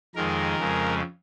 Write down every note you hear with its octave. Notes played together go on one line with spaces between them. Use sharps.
F2 D#3 G#3 A#4
F2 C#3 G#3